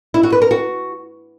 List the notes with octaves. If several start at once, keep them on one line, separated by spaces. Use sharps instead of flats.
E4
F#4
B4
A#4
F#4